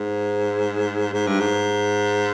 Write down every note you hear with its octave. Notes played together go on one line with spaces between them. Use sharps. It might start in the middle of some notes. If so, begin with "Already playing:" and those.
Already playing: G#2
G#2
G2
G#2